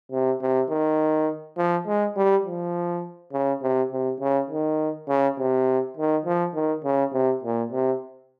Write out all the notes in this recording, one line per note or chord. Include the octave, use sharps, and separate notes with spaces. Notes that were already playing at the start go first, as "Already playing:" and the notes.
C3
C3
D#3
F3
G#3
G3
F3
C#3
C3
C3
C#3
D#3
C#3
C3
D#3
F3
D#3
C#3
C3
A#2
C3